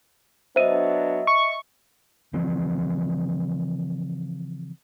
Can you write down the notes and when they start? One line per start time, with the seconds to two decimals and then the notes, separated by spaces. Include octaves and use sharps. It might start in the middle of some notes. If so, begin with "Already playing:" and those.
0.56 F#3 B3 D4 C5 D#5 E5 D#7
1.27 C#6
2.33 C#3 E3 F3 C4